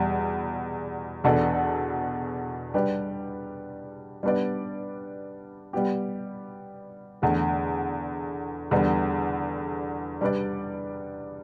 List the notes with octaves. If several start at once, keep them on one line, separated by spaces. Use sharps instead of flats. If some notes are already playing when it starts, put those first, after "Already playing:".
Already playing: E2 B2 G3
E2 B2 B3 D4 A4
G3 D4 G4 B4
G3 B3 D4 B4 D5
G3 B3 G4
E2 D3 A3
E2 D3 G3 B3
G3 D4 B4 D5